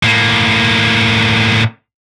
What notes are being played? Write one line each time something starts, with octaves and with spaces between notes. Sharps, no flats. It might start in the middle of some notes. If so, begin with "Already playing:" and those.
A2 A#3